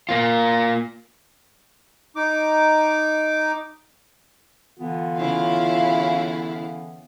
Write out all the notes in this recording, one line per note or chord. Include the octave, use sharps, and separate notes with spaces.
A#3 F4
D#4 D6
D3 E3 B3 F4
C#3 E4 F5